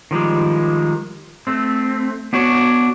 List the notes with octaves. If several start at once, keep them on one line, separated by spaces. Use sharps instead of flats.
D#3 F3 G3 G#3
A3 C4
B3 D4 F#4 C#5